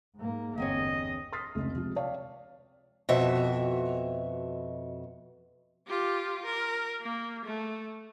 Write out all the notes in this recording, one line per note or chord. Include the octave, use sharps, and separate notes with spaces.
G#2 A#3
G1 E2 C4 C#5 D#5
C6 D#6 F6 A6 B6 C7
F1 C#2 A3
C3 F3 G#3
C#5 D5 F5 G5 A5
F2 B2 F#4 E5
F4 G4
A#4
A#3
A3